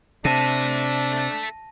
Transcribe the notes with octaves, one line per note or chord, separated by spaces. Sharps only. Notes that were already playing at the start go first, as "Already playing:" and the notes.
C3 D4 A4 E5 A5 A#6 D#7